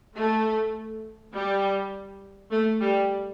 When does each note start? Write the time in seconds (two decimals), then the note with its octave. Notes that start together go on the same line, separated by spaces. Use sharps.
0.16 A3
1.34 G3
2.51 A3
2.80 G3